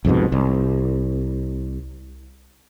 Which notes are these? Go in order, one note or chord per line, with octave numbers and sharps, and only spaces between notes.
C2 F2 G#2 B2
C2